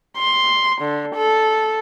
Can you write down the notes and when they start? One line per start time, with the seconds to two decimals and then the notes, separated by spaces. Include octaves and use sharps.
0.17 C6
0.81 D3
1.15 A4